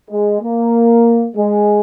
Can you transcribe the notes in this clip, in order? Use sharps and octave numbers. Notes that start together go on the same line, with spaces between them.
G#3
A#3
G#3